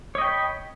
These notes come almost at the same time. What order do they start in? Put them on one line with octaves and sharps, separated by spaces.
C#5 D#5 G5 B5